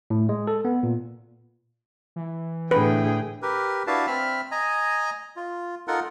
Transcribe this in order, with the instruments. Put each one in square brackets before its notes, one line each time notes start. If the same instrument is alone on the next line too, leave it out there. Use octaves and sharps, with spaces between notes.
[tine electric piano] A2
G#3
A4
B3
A#2
[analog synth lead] E3
[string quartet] A2 D3 [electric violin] G#4 G5 [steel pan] B4
[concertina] G4 A#4 B4
D4 E4 F#4 B4 F5 A5
C4 E5 B5 F6
D#5 G#5 A#5
F4
D#4 F4 A4 A#4 F#5